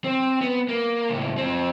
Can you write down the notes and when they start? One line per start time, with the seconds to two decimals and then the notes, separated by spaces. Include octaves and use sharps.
0.04 C4
0.41 B3
0.69 A#3
1.10 C#2 A2
1.38 F2 C4